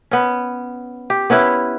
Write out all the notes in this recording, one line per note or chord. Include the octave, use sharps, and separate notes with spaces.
B3 C#4
G4
B3 C#4 E4 B4